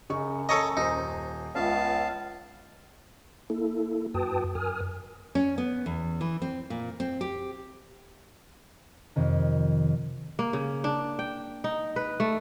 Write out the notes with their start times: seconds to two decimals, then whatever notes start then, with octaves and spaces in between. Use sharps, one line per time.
0.10 F#2 C#3 D#5 C#6
0.49 A4 C#5 D#5 A5 A#5 C#6
0.77 D#1 D#4 C5
1.55 C#2 B3 C#4 F4 E5 F5 A5
3.50 A#3 E4 A4
4.14 F#2 F#4 B4 G5 A5 D#6
4.55 F#2 A#4 G#5 D#6 F6
5.35 C#4
5.58 B3
5.86 E2
6.21 E3
6.42 C4
6.70 A#2
7.00 C4
7.21 G4
9.16 F2 C3 D#3
10.39 A#3
10.53 C#3
10.84 D4
11.19 G5
11.64 D#4
11.96 B4
12.20 A3